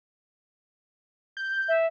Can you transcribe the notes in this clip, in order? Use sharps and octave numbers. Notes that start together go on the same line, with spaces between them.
G6
E5